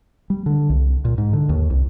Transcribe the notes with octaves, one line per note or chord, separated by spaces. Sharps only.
G3
D3
C2
A#2
G#2
D3
D#2
C2